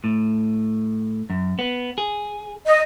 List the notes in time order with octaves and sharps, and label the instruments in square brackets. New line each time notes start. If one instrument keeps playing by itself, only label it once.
[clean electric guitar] A2
F#2
B3
G#4
[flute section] D#5